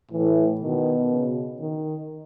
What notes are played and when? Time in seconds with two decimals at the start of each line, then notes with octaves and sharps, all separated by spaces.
0.12 A2 E3
0.61 B2 D#3
1.11 C#3
1.60 D#3